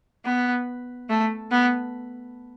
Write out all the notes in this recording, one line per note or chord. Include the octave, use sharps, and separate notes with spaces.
B3
A3
B3